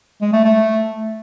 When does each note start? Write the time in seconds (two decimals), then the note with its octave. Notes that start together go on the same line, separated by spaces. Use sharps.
0.21 G#3
0.33 A3
0.44 A3